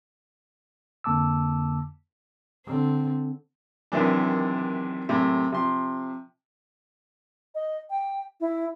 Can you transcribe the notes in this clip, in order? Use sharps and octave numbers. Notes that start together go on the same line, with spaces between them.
F2 D3 A#3 A5 D6 E6
D3 C4
F#2 C3 D#3 E3 D4
F#2 A2 C3
C3 F3 C6
D#5
G5
E4